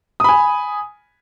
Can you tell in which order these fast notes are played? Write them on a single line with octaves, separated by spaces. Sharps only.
D#6 B5 G#5